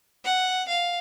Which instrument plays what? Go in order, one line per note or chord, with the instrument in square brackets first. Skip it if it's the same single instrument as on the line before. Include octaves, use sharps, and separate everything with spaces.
[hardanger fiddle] F#5
F5